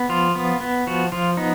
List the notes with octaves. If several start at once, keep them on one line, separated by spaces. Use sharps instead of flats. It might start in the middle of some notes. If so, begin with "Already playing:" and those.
Already playing: B3
F3 F4
B3
B3
F3 F#4
F3 F4
B3 D#4